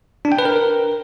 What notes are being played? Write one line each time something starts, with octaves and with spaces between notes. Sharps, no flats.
D4
G5
B4
A#4